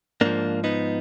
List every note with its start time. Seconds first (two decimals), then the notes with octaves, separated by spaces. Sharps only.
0.21 G#2 F3 A#3 D4
0.64 B3 D#4